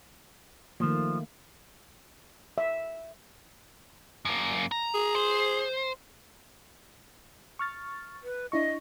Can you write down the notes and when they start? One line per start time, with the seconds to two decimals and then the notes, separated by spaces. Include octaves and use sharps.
0.80 D#3 F3 A3 A#3
2.58 E5
4.25 F#2 A#3
4.71 A#5
4.94 G#4
5.15 C5
7.59 C#6 F6 A6
8.23 B4
8.52 D4 E4 D#5 C#6